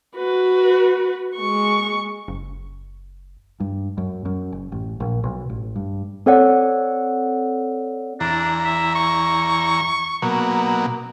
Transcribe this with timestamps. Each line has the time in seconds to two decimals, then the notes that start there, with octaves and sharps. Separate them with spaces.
0.16 F#4 B4
1.36 G#3 C#6
2.28 F#1
3.60 G2
3.98 F#2
4.25 F#2
4.53 F#1
4.72 A1
5.00 A#1
5.24 B1
5.50 A1
5.76 G2
6.26 C4 A4 C#5 D5 F#5
8.20 E2 D4 A#5
8.65 E5
8.95 C#6
10.22 B2 F#3 A#3